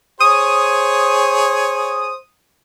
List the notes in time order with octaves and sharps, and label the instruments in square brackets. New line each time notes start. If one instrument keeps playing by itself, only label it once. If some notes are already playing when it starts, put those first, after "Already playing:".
[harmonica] G#4 C#5 [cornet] C5 [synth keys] D#6